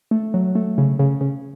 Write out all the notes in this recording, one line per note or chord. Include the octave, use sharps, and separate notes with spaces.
A3
F#3
A3
C#3
C#3
C#3